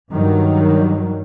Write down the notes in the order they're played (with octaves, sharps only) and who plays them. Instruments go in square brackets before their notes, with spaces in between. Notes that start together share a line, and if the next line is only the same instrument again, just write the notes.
[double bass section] G2 D#3 F#3